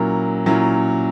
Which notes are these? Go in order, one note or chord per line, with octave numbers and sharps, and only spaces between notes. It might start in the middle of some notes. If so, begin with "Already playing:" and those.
Already playing: A#2 F#3 C#4 E4 A#4
A#2 F#3 C#4 E4 A#4